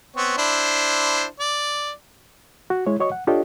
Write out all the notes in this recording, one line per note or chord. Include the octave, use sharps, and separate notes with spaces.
B3 C4 C#5
D4 E4 C5
D5
F#4
G#3 E4 C#5
F#4 C#5 D#5 C#6
F#5
D4 F4 G4 A4 C#5 D#5